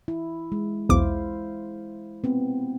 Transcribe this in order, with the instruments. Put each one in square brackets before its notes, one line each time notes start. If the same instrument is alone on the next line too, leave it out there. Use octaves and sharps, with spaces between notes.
[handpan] E4
G#3
[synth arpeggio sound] B1 E2 D6 [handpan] E4 C5 F5
[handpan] B3 C4